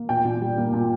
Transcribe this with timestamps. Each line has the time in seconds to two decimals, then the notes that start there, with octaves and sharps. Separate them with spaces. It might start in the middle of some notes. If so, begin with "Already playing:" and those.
Already playing: A#3
0.09 A#2 G5
0.25 A#2
0.41 G3
0.57 A#3
0.73 A#2